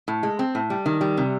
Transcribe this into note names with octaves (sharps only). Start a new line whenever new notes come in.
A2
G#3
C4
A2
G3
D#3
G3
C3